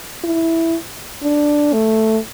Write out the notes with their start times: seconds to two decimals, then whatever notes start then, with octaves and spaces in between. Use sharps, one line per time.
0.24 E4
1.23 D4
1.73 A3